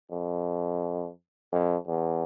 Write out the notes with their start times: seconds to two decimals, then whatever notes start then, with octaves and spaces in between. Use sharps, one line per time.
0.11 F2
1.52 F2
1.87 E2